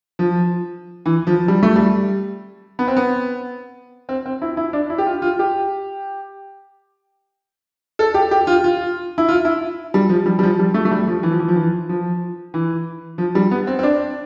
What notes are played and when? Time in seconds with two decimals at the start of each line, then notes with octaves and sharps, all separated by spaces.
0.19 F3
1.06 E3
1.27 F3
1.48 G3
1.63 A3
1.76 G3
2.79 B3
2.88 C4
2.96 B3
4.09 C4
4.26 C4
4.42 E4
4.57 E4
4.73 D4
4.90 E4
4.98 G4
5.06 F4
5.22 F4
5.39 G4
7.99 A4
8.14 G4
8.31 G4
8.47 F4
8.64 F4
9.18 E4
9.28 F4
9.45 E4
9.94 G3
10.09 F3
10.26 G3
10.39 G3
10.43 F3
10.59 G3
10.74 A3
10.85 A3
10.91 G3
11.07 F3
11.23 E3
11.32 F3
11.40 E3
11.48 F3
11.56 E3
11.89 F3
12.54 E3
13.18 F3
13.35 G3
13.51 B3
13.67 C4
13.79 C4
13.83 D4